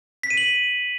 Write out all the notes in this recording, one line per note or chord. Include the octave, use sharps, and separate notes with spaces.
B6
D#7
F#7